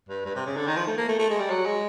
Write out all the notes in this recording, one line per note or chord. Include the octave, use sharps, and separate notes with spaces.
G2
G2
C3
C#3
D3
D#3
F3
A3
A#3
A3
A3
G#3
G3
F#3
G#3